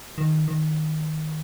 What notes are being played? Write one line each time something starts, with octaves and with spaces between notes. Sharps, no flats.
D#3
D#3